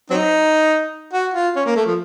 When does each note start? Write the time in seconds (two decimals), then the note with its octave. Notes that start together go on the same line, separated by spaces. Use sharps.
0.10 F#3 C4 D#4
1.13 F#4
1.34 F4
1.56 C#4
1.65 A#3
1.76 A3
1.86 F3